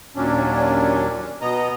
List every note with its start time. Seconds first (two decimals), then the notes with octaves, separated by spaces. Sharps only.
0.16 D#2 A#2 F#3 C#4 D4
1.41 B2 B3 D#5 A#5